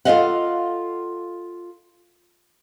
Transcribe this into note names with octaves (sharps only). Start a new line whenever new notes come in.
F4 A4 D5 D#5 F5 F#5